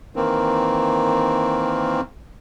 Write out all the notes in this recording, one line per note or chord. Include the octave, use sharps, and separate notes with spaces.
D#3 E3 A#3 C4